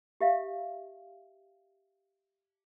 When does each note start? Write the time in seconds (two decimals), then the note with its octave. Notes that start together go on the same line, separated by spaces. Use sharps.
0.21 G4 E5 F5